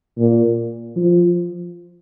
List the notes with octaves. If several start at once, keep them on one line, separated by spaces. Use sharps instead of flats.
A#2
F3